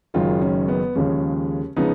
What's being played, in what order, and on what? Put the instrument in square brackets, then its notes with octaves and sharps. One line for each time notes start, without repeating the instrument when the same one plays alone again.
[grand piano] F#1 F#2 D#3 G#3 C#4 F4
C#4
B3
D#2 C#3 F3 G#3 C#4
C#3 F3 G#3 B3 D#4